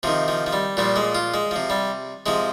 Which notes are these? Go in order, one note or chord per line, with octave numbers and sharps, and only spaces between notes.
C3 D#3 F3
F3
F3
G3
A#2 F3 G3
G#3
F4
G#3
C3 F3
G3
C3 F3 G#3